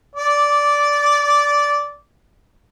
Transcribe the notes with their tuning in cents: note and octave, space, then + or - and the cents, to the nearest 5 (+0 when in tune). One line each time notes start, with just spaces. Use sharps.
D5 -10 D6 +0